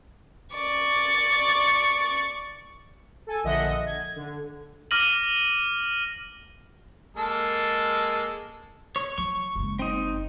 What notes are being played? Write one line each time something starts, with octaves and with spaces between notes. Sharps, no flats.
D5 C#6
A4 G#5
A#1 D3 D#5 E5 F#5
G#6
D3
D6 F6 A#6 D#7 F#7
G#3 A#3 A4
C#5
F3 F#3 C#6
F#1 G#3
C4 D#4